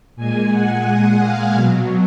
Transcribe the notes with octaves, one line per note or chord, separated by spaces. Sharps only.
A#2 G#3 G#5
F#5
F#5
F5
B2 F#3 F5